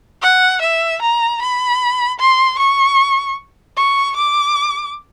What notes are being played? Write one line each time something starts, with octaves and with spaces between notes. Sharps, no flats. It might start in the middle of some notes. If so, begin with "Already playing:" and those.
F#5
E5
A#5
B5
C6
C#6
C#6
D6